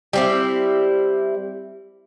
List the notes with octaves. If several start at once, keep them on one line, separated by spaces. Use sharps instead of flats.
G3 C4 E4